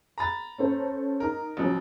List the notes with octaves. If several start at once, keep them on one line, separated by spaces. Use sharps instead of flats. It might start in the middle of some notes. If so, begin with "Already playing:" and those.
A#5 B5 A6
C#4 A4 C5
D#4 A#4 A#5
A1 C#3 F3 F#3